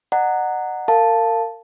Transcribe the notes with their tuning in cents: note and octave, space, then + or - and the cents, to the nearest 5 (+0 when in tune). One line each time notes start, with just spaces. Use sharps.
D#5 -40 F#5 +0 A#5 -20
A#4 -35 F5 -10 A5 +0